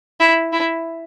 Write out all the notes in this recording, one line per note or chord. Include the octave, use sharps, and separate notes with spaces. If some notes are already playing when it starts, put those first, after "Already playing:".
E4
E4